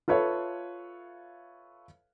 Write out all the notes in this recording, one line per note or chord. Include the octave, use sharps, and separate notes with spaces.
F4 A4 B4 C#5 E5 F5